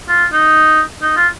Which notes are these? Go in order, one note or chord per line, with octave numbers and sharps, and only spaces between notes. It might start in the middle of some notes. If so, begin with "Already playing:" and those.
F4
D#4
D#4
F4